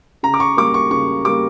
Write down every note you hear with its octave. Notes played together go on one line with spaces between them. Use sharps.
C#3 A#5
D6
C#6
G3 A#3 D6
C#6
C#3 C#6
G3 A#3 D6